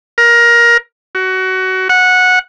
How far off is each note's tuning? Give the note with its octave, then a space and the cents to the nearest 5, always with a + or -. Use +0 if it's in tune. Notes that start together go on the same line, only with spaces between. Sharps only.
A#4 +20
F#4 +20
F#5 -15